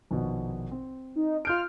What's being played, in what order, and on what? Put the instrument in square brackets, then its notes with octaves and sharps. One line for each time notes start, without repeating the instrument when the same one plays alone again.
[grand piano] A#1 B2 D#3
C4
[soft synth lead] D#4
[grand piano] F4 G6 D7 [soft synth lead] F6